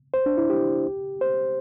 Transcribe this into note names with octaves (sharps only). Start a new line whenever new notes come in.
C5
D4
E4
G4
C5